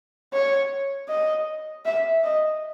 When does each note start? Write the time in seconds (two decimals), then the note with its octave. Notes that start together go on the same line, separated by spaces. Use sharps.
0.33 C#5
1.09 D#5
1.85 E5
2.24 D#5